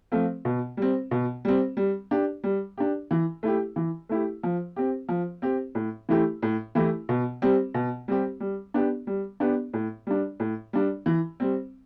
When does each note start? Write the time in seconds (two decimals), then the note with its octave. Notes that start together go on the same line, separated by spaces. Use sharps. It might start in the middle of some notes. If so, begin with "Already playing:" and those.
0.12 F3 A3 C4 F4
0.45 B2
0.77 G3 C4
1.11 B2
1.45 G3 C4
1.77 G3
2.11 D4 G4
2.44 G3
2.78 D4 G4
3.11 E3
3.43 A3 E4 G4
3.76 E3
4.09 A3 E4 G4
4.43 F3
4.76 C4 G4
5.09 F3
5.42 C4 G4
5.75 A2
6.09 E3 A3 E4 G4
6.42 A2
6.75 E3 A3 E4 G4
7.09 B2
7.42 G3 C4 G4
7.74 B2
8.08 G3 C4 G4
8.40 G3
8.74 B3 D4 G4
9.07 G3
9.40 B3 D4 G4
9.73 A2
10.07 G3 D4
10.40 A2
10.73 G3 D4
11.06 E3
11.40 G3 C4